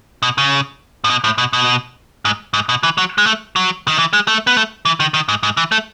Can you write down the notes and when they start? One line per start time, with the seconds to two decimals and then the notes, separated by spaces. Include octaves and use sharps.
0.23 B2
0.38 C#3
1.04 A2
1.10 B2
1.24 A2
1.38 B2
1.53 B2
2.25 G#2
2.54 G#2
2.69 B2
2.83 E3
2.98 F#3
3.18 G#3
3.26 A3
3.56 F#3
3.88 D#3
3.99 E3
4.13 G#3
4.28 A3
4.47 B3
4.57 A3
4.85 E3
5.00 D#3
5.14 D#3
5.29 G#2
5.43 G#2
5.57 E3
5.72 A3